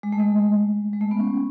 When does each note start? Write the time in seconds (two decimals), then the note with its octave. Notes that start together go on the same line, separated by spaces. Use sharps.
0.03 G#3
0.12 A3
0.20 G#3
0.93 G#3
1.01 A3
1.11 B3
1.20 C#4